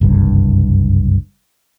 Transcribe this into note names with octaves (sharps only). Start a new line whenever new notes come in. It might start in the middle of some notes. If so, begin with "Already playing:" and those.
F#1 C2 G2